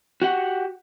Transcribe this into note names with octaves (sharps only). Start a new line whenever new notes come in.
F#4 G4 F#5